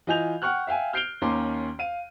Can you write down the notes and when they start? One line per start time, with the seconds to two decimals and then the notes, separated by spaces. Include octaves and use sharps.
0.07 E3 F4 D#5 G#5 G6 F7
0.42 F#5 G5 C#6 F6 F#6
0.67 E5 F5 G5 G#5
0.93 F6 G6 C7 D7 F7 G7
1.21 D#2 D#3 C#4 A#5 C6 D6
1.79 F5 D#7